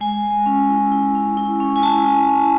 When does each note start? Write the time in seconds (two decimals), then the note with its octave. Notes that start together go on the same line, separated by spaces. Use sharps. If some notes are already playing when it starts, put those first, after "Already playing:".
0.01 G#3 G#5
0.23 G#3
0.46 C#4
0.70 E4
0.92 E4
1.15 C#4
1.37 E4
1.60 C#4
1.76 G#5
1.83 E4 A5
2.06 E4
2.29 C#4